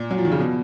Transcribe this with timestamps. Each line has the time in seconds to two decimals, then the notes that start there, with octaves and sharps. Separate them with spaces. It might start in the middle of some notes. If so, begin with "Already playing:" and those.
Already playing: A#2
0.11 F#3
0.18 F3
0.25 D#3
0.31 C#3
0.39 B2